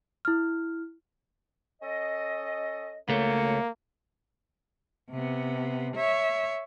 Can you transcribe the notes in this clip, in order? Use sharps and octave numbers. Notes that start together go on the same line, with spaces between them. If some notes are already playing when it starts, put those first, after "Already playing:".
E4 F6
C#4 A4 D#5
C#2 A3 A#3 F#4 C#5
C3 B3
C#5 E5